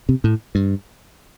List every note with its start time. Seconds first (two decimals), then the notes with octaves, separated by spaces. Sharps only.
0.09 C3
0.24 A2
0.55 G2